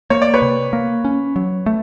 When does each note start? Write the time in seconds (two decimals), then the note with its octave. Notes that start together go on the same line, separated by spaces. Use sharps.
0.10 A#3 C#5
0.22 D5
0.34 B4 C#5
0.42 C3
0.73 A#3
1.05 C#4
1.36 F#3
1.66 A3